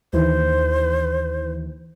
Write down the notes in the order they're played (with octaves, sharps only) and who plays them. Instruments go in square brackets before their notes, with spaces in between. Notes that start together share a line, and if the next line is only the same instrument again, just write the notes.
[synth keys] D#2 E3 [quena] C5